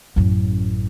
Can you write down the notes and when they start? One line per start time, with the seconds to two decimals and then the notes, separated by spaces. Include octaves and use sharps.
0.16 A1 F#2